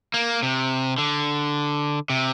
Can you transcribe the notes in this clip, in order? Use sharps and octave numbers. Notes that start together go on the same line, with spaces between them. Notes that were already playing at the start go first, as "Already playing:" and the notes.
A#3
C3
D3
C3